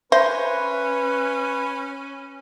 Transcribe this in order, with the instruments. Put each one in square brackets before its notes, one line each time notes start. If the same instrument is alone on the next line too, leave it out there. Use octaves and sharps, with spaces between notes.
[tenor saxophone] C#4 [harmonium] B4 [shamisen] C5 [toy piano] E5